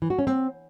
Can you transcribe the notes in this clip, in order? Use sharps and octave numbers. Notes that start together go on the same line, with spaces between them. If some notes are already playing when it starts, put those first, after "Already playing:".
E3
F#4
C#4
C4